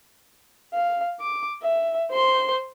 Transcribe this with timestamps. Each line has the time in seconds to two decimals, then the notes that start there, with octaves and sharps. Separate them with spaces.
0.74 F5
1.20 D6
1.63 E5
2.11 C5 C6